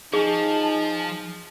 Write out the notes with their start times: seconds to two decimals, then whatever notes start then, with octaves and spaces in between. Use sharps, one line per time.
0.13 F3 D#4 G#4 G#5 A5